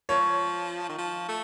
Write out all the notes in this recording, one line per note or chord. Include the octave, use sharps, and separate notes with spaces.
F3 C#5
D#3
F3
A3